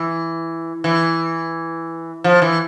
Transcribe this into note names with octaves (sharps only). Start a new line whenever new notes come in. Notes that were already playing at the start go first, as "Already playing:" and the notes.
Already playing: E3
E3
F3
E3